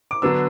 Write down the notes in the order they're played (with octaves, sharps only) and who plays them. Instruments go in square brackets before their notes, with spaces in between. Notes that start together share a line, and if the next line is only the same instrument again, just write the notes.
[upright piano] D6
D3 F#3 B3 D4 E6